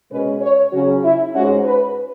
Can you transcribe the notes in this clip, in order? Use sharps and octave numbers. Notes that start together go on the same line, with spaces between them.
B2 G#3 C#4 B4
C#5
C#3 F#3 C#4 F#4
E4
G#2 G#3 C#4 F#4
B4